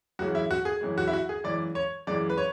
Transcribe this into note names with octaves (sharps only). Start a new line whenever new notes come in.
F#2 C#3 E3 G#3 F#4
E4
F#4
G#4
F#2 C#3 E3 G#3
F#4
E4
F#4
G#4
F#2 C#3 E3 G#3 D5
C#5
F#2 C#3 E3 G#3 D5
B4
C#5